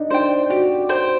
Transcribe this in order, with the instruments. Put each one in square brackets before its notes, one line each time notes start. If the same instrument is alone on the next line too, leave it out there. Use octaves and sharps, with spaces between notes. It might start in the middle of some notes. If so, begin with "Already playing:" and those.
Already playing: [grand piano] D4 D#4
[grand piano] D4 [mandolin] C5 G5
[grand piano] F#4 [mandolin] G4
[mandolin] C5 G5